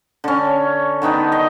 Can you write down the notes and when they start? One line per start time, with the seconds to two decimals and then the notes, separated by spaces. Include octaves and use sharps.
0.24 D3 C#4
1.02 D3 D#3 B3 D#4
1.32 D#5